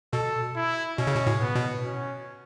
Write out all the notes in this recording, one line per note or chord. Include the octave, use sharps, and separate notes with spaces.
B2 A4
E4
B2 C#4
C#3
B2
A2
B3
B2
C#4